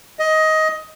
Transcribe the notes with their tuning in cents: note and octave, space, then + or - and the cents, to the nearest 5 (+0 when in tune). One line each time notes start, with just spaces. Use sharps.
D#5 +15